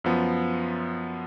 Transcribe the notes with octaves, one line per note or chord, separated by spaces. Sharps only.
F#2 F3 B3